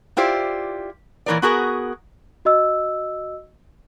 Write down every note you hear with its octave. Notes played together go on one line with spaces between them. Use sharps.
E4 F4 G4 C5 D5
A#2 E3 C4 A#4 C#5 D5
B3 F#4 G#4 A#4
F#4 D#5 E6